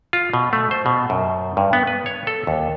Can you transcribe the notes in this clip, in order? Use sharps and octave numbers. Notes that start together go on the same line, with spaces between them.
F4
B2
A3
C5
B2
F#2
G2
B3
B4
C#5
A4
D#2